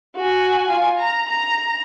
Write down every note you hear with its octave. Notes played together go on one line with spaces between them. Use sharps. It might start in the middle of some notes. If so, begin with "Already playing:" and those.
F#4 G#5
F4 G#5
A#5
A#5